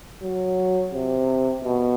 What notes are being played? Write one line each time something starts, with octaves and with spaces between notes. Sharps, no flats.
F#3
C3
B2